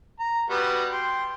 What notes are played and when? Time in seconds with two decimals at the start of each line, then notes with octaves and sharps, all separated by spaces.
0.20 A#5
0.50 G3 B3 F#4
0.92 G5 C6